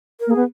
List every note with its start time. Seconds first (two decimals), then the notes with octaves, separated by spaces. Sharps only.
0.20 A#4
0.27 A#3
0.30 G#4
0.36 B3